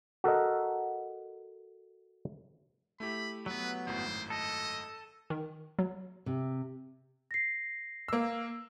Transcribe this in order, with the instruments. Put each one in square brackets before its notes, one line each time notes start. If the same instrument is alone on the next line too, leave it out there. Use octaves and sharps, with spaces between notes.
[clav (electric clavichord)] F#4 A4 A#4 D#5
[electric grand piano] A3 E4 G4 [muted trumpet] B5
[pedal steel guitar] F#3 B3 [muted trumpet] B4
[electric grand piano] G#1 F#2 A2 [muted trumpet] C5
[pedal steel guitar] A4 [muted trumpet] D#5
[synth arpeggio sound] D#3
F#3
[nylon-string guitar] C3
[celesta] A#6 C7
[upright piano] A#3 E6